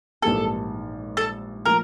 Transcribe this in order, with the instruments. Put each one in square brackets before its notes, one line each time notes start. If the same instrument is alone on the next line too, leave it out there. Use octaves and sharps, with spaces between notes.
[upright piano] A#1 G#2 E3 G3 A#3 [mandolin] A4
[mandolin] A4
[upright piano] A#2 F3 A3 [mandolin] A#4